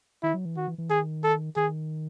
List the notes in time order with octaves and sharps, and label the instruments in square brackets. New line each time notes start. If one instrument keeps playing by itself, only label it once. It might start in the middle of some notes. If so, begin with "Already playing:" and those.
[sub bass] D#3 [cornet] E4
[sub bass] F#3
E3
[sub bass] D#3 [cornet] F#4
[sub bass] E3
E3
[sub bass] D#3 [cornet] G#4
[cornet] A4
[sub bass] D#3 [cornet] G#4